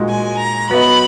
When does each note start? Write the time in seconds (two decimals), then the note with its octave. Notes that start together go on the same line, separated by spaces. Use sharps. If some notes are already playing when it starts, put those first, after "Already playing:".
Already playing: A#2 G#3 D#4 F#4
0.09 G#5
0.38 A#5
0.70 F#3 B3 F#4 B4 D#5 B5